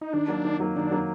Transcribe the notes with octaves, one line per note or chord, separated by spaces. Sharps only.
D#4
D#3 D4
F#3 A#3
D#3
F#3 A#3
D#3 D4
F#3 A#3